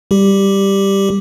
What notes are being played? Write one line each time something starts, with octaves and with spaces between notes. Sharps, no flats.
G3 G4